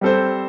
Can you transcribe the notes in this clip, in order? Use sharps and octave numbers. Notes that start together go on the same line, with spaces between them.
G3 C4 A4 C5